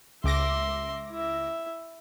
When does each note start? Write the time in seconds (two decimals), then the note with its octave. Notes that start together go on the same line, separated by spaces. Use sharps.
0.24 C#2 E5 C6 D6 A#6
1.10 E4 E5